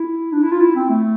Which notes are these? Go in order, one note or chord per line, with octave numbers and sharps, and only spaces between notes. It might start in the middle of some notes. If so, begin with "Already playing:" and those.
Already playing: E4
D4
E4
F4
E4
C4
A3